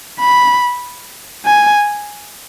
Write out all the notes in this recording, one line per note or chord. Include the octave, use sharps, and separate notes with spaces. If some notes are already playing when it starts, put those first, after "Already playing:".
B5
G#5